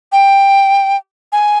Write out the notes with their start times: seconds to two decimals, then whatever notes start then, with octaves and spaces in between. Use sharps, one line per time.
0.12 G5
1.32 G#5